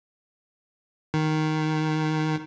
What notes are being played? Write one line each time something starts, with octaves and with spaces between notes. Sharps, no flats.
D#3